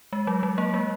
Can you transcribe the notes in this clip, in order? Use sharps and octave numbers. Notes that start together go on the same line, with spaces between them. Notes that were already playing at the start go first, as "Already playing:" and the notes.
G#3
F#3
F#3
A#3
G#3